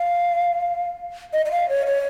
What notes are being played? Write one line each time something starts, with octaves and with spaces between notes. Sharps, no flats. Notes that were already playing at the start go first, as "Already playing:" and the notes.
Already playing: F5
D#5
D#5
F5
C#5
C#5